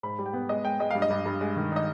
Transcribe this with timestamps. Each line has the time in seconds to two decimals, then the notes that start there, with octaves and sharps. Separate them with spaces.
0.03 G#2 B5
0.19 G3
0.26 G5
0.33 B3
0.49 G#3 D#5
0.64 G#3 G5
0.79 G#3 D#5
0.91 G2 F5
1.02 D#5
1.10 G2
1.26 G2
1.41 G#3
1.56 D#3
1.72 D#4 D#5